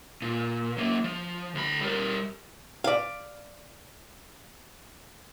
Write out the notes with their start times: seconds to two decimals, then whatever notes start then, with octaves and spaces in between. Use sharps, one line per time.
0.22 A#2
0.78 F#3 A#3
1.04 F3
1.55 D2 B5
1.81 G3 A#4
2.84 D5 F5